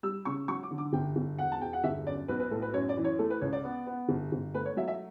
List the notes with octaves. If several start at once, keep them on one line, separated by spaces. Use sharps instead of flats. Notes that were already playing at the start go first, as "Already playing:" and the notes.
G3 E6
C#3 C#6
F#3 C#6
D6
D3
D6
G1 G5
G1
E1 F#5
A5
E1 G5
F#5
G1 E5
F#2 D5
B1 B4
B4
A2 A4
B4
F#2 C#5
D5
E3
C#5
A3 A4
B4
C#2 C#5
D5
B3
B3
G1
G1
A3 B4
C#5
F#3 E5
E5